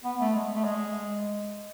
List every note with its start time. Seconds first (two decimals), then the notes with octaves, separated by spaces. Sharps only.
0.05 B3
0.20 A3
0.35 G#3
0.55 A3
0.65 G#3